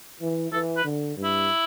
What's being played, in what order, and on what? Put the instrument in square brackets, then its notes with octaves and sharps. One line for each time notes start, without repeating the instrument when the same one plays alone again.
[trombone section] E3
[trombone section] E3 [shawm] A4
[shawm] B4
[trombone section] D3
G2
[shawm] E4